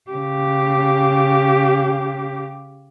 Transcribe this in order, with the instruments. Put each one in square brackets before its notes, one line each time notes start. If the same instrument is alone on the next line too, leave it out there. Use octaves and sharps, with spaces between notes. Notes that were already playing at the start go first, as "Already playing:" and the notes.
[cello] C#3 G4